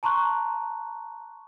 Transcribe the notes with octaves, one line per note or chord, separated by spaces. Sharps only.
A5 A#5 C6 C#6 F#6